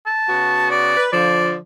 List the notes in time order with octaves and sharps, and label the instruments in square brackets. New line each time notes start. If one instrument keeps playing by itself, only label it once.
[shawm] A5
[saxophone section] C#3 B3 F#4
[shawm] D5
[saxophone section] B4
[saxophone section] D3 F3 [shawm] D5